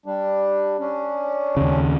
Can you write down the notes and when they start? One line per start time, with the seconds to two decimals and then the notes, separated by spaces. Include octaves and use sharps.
0.06 G3 D4
0.80 C#4 D4
1.57 D#2 C#3